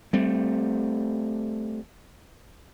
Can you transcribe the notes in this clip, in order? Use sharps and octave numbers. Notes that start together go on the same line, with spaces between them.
G3 A3 C4